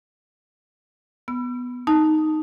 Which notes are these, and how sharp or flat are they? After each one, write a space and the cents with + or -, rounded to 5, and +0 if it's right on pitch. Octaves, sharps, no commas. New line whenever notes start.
B3 +0 E6 +40
D#4 +0 A5 +0